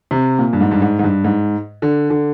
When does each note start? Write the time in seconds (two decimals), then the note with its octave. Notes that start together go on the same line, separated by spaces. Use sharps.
0.11 C3
0.39 A#2
0.53 G2
0.61 G#2
0.71 G2
0.82 G#2
0.99 G#2
1.04 G2
1.24 G#2
1.82 D3
2.10 D3